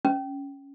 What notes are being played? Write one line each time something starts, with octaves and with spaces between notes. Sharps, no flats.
C#4